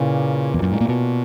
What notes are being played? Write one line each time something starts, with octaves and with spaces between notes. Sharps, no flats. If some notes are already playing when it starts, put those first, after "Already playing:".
Already playing: A#2 C#3 A#3 E4 B4
E2
F#2
G#2
A#2
B2